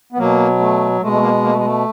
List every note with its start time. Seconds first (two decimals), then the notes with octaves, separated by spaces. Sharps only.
0.12 B3
0.18 B2 F#3 A#3
0.59 A3
1.01 B2 G#3 A3
1.12 A3
1.22 A#3
1.43 A#3
1.50 A3
1.58 G#3
1.65 A3